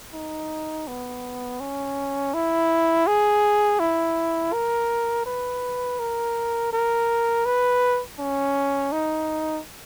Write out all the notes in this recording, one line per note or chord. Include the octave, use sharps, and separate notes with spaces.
D#4
B3
C#4
E4
G#4
E4
A#4
B4
A#4
A#4
B4
C#4
D#4